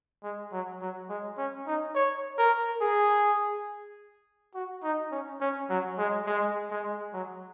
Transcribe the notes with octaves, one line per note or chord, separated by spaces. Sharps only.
G#3
F#3
F#3
G#3
C#4
D#4
C#5
A#4
G#4
F#4
D#4
C#4
C#4
F#3
G#3
G#3
G#3
F#3